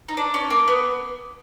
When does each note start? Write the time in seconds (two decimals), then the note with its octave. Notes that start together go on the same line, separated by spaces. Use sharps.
0.09 D#4
0.17 D4
0.34 C#4
0.50 A#3
0.68 B3